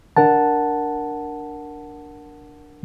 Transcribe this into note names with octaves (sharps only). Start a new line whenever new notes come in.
D4 A#4 F#5 A5